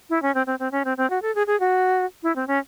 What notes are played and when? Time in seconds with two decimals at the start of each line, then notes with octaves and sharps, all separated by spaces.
0.10 E4
0.22 C#4
0.35 C4
0.47 C4
0.59 C4
0.72 C#4
0.85 C4
0.97 C4
1.10 F#4
1.22 A4
1.35 G#4
1.47 G#4
1.60 F#4
2.23 E4
2.36 C4
2.47 C#4